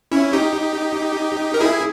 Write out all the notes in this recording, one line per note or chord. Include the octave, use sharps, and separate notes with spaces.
C#4 E4
D#4 G4
A#4
E4 G#4